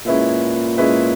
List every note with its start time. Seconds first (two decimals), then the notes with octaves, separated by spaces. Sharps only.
0.06 A#2 G#3 C#4 E4 B4 E5
0.77 G#3 C#4 E4 B4 E5